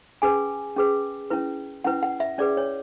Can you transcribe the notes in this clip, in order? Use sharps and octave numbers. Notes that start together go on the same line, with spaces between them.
C#4 G#4 B4 G#5
C#4 G#4 B4
C#4 E4 B4
C#4 E4 B4 F#5
F#5
E5
C#4 G#4 B4 D5
C#5